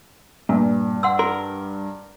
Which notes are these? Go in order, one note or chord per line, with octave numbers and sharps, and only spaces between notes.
G2 A#2
F#5 C6 E6
A#4 C6